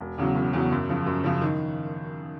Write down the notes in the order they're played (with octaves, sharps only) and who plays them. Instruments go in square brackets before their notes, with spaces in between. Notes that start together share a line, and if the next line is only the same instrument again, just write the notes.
[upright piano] E1
E2 C#3 F#3
E1
E2 C#3 F#3
F#2
C#3 F3
F#2
C#3 F3
D#3